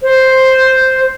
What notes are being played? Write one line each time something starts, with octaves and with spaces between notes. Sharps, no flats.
C5